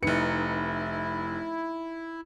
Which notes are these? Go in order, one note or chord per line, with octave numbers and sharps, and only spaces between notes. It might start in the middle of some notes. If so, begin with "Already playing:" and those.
F1 D#4 E4 B4 C#7